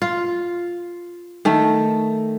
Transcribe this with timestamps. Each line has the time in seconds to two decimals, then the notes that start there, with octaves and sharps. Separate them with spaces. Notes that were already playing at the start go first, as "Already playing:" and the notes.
0.02 F4
1.45 D#3 A3